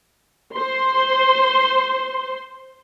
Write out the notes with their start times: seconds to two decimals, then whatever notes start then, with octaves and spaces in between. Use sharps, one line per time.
0.55 C5 C6